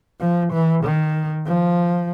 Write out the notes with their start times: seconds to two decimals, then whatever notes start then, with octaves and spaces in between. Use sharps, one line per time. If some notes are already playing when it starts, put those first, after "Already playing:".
0.21 F3
0.53 E3
0.84 D#3
1.47 F3